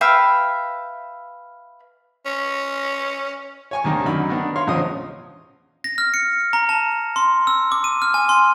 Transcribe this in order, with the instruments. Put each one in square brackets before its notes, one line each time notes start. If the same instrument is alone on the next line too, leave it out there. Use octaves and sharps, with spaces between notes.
[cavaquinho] B4 E5 F5 G5
[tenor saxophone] C#4
[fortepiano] C#5 G#5 C#6
D#2 C3 D#3 D4
F#2 D3 D#4 B5
D#3 B3 D4
C#5 F5 C6
E2 A2 C#3 F3 D#5 D#6
[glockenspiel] A#6
F6
C#7
A#5
A5
C6
E6
D6
D#7
F6
G#5
C6